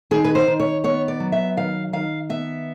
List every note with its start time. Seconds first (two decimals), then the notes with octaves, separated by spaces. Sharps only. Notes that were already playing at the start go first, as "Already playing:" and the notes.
0.11 D#3 G#4
0.24 B4
0.35 C5
0.47 D#3
0.60 C#5
0.84 B3 C#5
1.08 D5
1.20 F#3
1.32 E5
1.57 D#3 F5
1.93 D#3 F5
2.29 B3 E5